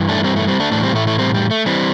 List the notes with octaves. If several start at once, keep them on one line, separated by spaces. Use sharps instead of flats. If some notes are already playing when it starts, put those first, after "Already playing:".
Already playing: G2 E3
A3 D4
G3 C4
A3
G3 C4
A3 D4
A2 E3 A3 D4
G3 C4
A3
A3
G3 C4
G3
A3
E3 G3 C4